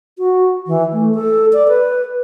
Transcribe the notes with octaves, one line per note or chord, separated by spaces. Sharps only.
F#4
E3
A3
A4
D5
B4